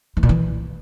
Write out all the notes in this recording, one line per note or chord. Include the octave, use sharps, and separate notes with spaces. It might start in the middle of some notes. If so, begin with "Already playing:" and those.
E3
A#2
E3